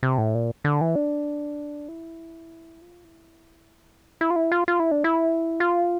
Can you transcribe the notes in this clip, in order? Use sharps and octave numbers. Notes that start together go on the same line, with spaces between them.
C3
A2
A#2
D3
E3
D4
E4
F4
E4
E4
F4
E4
F4
F4
E4
D4
E4
F4